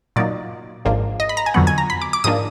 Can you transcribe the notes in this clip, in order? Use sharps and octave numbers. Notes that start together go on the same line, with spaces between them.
A#2 F#3 A#3 D#4 D5
G#1 G#2 F3 A#3 D4
D#5
B5
A#5
G#5
F2 D3 F#3 B3 F#5
G#5
A#5
B5
D6
D6
G#2 F3 A#3 D4 D#6